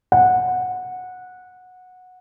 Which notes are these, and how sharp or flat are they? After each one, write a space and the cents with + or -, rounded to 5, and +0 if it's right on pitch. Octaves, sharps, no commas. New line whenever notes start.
F#5 -15